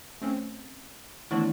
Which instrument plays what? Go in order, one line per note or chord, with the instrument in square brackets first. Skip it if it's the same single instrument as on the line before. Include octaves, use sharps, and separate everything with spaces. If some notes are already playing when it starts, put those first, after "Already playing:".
[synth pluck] A3 C4 C#4
[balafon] D#3 E3 A3 [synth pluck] B3 D4 E4